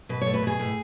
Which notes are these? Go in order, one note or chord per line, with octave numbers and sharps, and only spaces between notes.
B2 B4
C#5
A3
B4
B2 G#4
A2